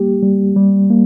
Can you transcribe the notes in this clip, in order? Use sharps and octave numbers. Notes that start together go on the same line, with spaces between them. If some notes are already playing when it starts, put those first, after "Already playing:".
Already playing: G3 A#3 G4
G3
G3
A#3